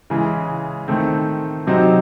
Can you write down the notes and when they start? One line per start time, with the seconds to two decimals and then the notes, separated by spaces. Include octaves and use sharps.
0.10 C#3 E3 G#3
0.88 D#3 A3 C4
1.67 C3 F#3 C4 D#4